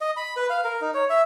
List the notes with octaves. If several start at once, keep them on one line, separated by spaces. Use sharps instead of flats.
D#5
B5
B4
F5
A#4
D#4
C#5
E5